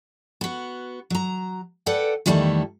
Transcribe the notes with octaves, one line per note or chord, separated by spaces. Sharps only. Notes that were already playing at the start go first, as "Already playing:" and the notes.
B3 F#4
F#3 A#5
A4 B4 D5 F#5 G5
E2 D#3 G3 A3 E4 A5